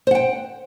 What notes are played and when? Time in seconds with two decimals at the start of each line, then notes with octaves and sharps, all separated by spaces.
0.07 C5
0.11 F#5
0.15 G5